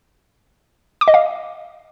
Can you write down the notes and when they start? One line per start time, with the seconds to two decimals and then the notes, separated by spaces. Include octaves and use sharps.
1.01 D6
1.08 D#5
1.14 F5